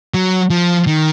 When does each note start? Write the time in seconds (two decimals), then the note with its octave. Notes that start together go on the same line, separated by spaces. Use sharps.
0.14 F#3
0.50 F3
0.87 D#3